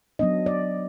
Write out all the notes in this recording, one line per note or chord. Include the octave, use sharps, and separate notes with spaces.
F#3 B3 D4 D#5
D5